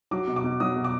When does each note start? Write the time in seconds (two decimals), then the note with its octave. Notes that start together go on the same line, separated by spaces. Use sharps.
0.11 F#3 D6
0.27 B2
0.36 D6
0.44 B2
0.60 F#3 D#6
0.76 B2
0.84 D6